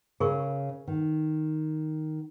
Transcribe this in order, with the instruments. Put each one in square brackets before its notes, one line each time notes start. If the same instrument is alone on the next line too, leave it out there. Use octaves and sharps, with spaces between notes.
[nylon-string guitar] C#3 [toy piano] G#4 A#4 C#6
[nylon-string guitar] D#3